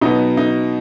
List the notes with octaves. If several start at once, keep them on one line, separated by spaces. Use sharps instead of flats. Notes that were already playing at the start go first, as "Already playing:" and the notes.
B2 F#3 B3 D#4
D#4